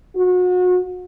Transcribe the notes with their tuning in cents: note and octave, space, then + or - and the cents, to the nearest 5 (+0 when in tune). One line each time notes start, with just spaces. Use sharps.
F#4 -35